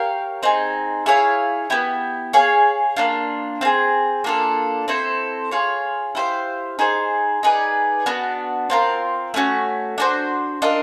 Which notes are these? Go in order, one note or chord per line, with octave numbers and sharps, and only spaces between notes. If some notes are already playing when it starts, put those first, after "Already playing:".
Already playing: G4 A#4 C#5 F5
C4 D#4 G#4
E4 G#4 C#5 F5
B3 E4 G4
G#4 C#5 F5
A#3 D4 F4
C4 F4 G#4
A#3 D4 F4 A4
C4 E4 A4 C5
F4 G#4 C#5 F5
E4 G4 C5 F5
D#4 G#4 C5
D#4 G#4 B4 D5
B3 D4 F#4
C4 F4 A#4
A3 C#4 F#4
D4 F#4 A4 C5
D4 F4 A#4 D#5